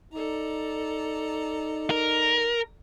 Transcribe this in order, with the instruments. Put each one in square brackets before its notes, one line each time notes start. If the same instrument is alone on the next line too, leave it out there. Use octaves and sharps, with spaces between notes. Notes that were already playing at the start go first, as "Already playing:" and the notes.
[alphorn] D#4 [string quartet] A4 D5 A#5
[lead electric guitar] A#4